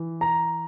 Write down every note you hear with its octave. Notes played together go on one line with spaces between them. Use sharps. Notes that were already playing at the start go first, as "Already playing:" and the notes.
Already playing: E3
A#5